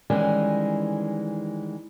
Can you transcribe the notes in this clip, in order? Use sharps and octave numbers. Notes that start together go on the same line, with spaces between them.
D#3 E3 G3 G#3 C#4